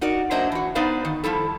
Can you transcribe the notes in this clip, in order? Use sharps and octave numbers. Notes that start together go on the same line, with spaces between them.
D#4 F#4 A#4 D5
F#3 A#3 D4 C5 D#5 E5
E3 F#4
B3 D#4 B4 C5 D5 F5
D#3
F3 G3 E4 A4